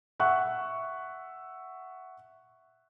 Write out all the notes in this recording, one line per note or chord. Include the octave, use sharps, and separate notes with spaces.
E5 F#5 C#6 F#6